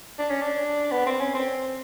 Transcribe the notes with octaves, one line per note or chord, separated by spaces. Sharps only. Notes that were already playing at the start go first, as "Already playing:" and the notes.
D4
C#4
D4
B3
C4
C#4
C4